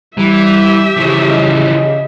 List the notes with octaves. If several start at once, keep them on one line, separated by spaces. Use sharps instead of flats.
E3 G3 G4 E5
C#3 E3 F3 C#6
D#5